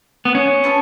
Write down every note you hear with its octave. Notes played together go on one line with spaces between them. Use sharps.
B3
C#4
B3 F4 A4